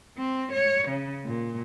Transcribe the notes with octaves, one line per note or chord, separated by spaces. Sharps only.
C4
C#5
C#3
A#2